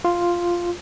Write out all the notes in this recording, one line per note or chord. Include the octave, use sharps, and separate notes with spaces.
F4